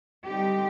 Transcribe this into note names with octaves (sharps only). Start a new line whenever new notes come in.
D3 G3 C4 D#4 G4